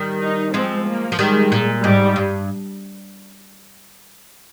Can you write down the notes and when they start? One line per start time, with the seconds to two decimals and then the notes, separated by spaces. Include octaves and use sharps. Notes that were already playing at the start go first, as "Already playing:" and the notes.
Already playing: D#3 G3
0.21 D#4
0.54 F3 G#3 C4
0.87 A#3
1.12 F3
1.19 D#3 G3 G#3
1.52 A#2
1.84 G#2 G3
2.16 G2